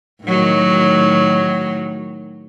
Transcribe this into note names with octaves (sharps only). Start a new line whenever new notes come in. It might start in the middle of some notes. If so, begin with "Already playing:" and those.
A2 D#3 F#3